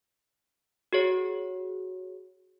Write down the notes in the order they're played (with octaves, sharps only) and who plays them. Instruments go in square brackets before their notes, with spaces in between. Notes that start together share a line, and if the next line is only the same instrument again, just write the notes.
[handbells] F#4 G#4 C#5